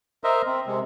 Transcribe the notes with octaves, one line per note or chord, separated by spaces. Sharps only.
A#4 C5 D#5 E5
C4
C3 G#3